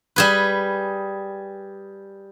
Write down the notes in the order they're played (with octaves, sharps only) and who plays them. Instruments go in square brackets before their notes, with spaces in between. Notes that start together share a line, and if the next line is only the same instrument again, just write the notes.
[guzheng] G3 G#4 B4